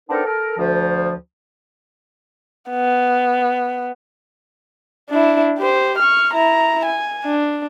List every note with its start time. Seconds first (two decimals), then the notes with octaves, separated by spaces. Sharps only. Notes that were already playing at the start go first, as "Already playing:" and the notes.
0.10 B3 C4 D4 D#4 A4 A#4
0.25 A4 A#4
0.58 D2 F3
2.70 B3
5.09 D4 E4
5.58 G4 C5
5.98 C#6 F6
6.34 E4 A#5
6.86 G#5
7.25 D4